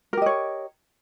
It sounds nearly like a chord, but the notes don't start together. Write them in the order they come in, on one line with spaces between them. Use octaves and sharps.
A#4 G4 D#5 C#5